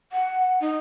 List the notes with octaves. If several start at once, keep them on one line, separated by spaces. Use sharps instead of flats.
F#5
D#4